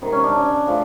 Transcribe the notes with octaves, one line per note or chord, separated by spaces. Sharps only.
C3 D#3 G#3
C#4
D4
C#3 F3 A3